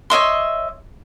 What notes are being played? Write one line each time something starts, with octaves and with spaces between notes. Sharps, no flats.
C#5 D#5 E5 C6